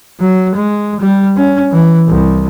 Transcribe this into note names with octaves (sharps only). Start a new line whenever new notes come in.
F#3
G#3
G3
C#4
E3
C2